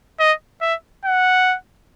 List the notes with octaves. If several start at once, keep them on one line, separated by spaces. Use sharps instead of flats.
D#5
E5
F#5